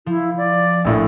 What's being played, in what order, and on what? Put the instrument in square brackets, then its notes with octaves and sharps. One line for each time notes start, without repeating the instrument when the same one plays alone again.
[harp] F3 [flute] E4
[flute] D5
[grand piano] A#1 A2